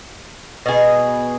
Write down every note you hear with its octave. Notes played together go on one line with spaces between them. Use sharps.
B2 G#4